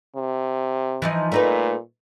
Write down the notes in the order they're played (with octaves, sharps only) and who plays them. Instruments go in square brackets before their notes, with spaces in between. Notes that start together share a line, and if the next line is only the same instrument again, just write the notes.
[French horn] C3
[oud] E3 F3 D#4
[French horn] A#2 [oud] A3 D#4 B4